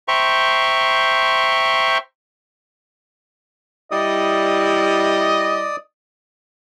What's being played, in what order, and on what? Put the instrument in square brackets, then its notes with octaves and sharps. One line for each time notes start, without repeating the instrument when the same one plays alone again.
[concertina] C5 E5 G5 A#5 C6 C#6
[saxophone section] G3 E4 [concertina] D5 D#6 [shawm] D#5